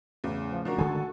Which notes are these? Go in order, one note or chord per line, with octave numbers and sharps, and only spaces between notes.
E2 A2 C#3
F3
F3 D4 F#4 A#4
D3 D#3 G#3 A4 G#5